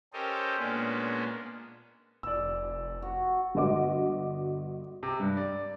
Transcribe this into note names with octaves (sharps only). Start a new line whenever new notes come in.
C#4 G4 A4 A#4 C5 D#5
A#2 G#3 A#3 B3 C#4 D4
F1 D5 E6
F#4
G1 F#4 D#5 D6
C3
G2
D5